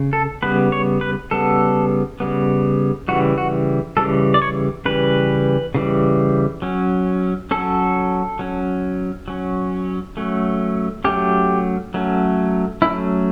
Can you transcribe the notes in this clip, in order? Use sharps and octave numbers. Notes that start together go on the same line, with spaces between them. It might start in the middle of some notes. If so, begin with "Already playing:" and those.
Already playing: C#3
A4
C#3 G3 B3 B4
C#5
B4
C#3 G3 B3 A4
C#3 G3 B3
C#3 E3 G3 F#4
F#4
C#3 E3 G3 A4
D5
C#5
C#3 E3 G3 B4
C#3 E3 G3
F#3 C#4
F#3 C#4 A4
F#3 C#4
F#3 C#4
F#3 A3 C#4
F#3 A3 C#4 G4
F#3 A3 C#4
F#3 A3 C#4 E4